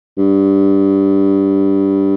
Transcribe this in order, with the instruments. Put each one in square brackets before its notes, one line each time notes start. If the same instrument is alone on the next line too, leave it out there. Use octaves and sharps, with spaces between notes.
[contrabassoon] G2